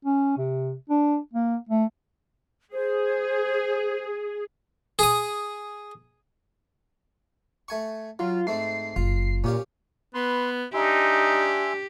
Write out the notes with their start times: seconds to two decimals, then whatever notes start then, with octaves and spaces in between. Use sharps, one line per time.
0.05 C#4
0.38 C3
0.90 D4
1.33 A#3
1.69 A3
2.73 G#4 C5
4.99 G#4 D#6
7.68 A3 G#5 C#6
8.19 F#3 F4
8.47 G#2 A3 C4 C7
8.96 F#1 F4
9.44 A#2 C#4 G4 F5
10.14 B3 B4 C6
10.74 D4 D#4 G4 E5 G#5 C6